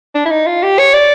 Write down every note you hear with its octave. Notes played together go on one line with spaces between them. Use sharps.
D4
E4
D#4
F4
G4
C#5
D5